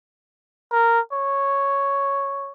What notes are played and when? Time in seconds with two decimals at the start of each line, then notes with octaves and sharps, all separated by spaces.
0.72 A#4
1.13 C#5